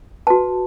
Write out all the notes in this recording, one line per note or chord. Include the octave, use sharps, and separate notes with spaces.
F#4 B4 A5